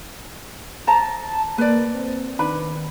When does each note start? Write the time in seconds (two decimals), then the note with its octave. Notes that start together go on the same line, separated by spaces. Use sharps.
0.87 C5 A5 A#5
1.58 A#3 B4 D5
1.94 C4
2.39 D#3 D4 B4 B5